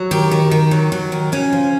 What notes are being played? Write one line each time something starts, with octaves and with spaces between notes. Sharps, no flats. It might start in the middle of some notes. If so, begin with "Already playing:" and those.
Already playing: F#3
D#3 G4
D#3
D#3
F#3
F#3
D#3
C#3 C#4
F3